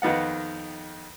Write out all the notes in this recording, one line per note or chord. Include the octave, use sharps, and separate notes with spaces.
F2 D#3 B3 F#5